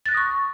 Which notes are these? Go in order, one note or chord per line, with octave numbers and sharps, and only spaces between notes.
C#6 D#6 F#6 A6 A#6